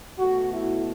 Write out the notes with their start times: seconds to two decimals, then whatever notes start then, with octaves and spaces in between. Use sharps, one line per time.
0.19 B1 B2 A3 F#4
0.53 E4